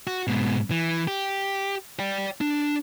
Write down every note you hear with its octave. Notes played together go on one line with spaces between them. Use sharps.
F#4
G#2 B2
E3
G4
D5 G5
D4